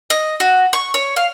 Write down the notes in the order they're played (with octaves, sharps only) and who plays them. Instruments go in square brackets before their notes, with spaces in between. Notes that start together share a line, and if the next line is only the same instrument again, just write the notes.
[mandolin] D#5
F#4
C#6
C#5
F5